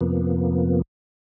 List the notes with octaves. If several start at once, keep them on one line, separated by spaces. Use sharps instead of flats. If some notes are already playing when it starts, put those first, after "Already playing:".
F2 C3 F3 A#3 B3